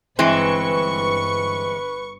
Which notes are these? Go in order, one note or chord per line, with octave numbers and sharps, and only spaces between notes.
G1 E3 G#3 C4 B4 C#6